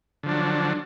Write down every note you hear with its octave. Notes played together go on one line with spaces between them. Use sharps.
D3 F3 F#3 D4